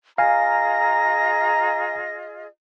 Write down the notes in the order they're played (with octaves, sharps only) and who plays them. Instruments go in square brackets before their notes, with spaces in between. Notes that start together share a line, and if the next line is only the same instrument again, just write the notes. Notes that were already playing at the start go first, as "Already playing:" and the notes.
[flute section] F4 G#4 D#5 [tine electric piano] F5 G#5 [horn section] A#5 [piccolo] A#6